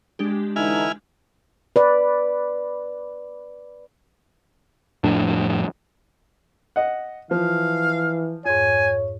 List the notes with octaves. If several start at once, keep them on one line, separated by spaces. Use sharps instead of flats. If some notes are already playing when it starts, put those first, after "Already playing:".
G#3 D4 G4
D3 E3 D#4 E4 G#5 F6
B4 D5
F2 A2 D4
D#5 F#5
E3 F3 F5
F2 G#2 C#5 G#5